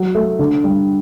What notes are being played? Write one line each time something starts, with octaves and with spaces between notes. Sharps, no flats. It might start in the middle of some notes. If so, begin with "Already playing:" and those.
Already playing: F#3
A3
D3
G3